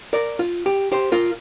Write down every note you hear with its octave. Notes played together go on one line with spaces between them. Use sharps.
A#4 D5
F4
G4
G4 C5
F4 A#4